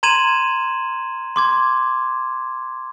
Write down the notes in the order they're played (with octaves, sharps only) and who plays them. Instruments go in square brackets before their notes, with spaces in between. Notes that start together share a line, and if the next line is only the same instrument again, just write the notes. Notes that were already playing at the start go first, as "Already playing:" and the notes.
[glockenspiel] A#5 C6 G#6 D#7 E7 F#7
C6 D6 G#6